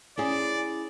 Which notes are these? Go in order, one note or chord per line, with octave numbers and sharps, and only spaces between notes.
C#4 E4 G#4 D5